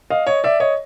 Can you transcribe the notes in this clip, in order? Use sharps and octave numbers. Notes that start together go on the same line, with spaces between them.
D#5 F5
C#5 D#5
D5 E5
C#5 D#5